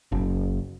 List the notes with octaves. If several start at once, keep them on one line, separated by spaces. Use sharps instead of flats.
F#1